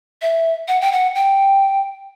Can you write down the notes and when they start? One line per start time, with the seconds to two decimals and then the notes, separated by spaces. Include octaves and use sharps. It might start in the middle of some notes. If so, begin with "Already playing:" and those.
0.22 E5
0.68 F#5
0.81 G5
0.92 F#5
1.15 G5